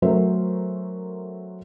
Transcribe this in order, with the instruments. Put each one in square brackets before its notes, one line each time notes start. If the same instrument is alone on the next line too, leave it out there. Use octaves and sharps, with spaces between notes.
[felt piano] F#3 A3 C#4 A#4 C5 E5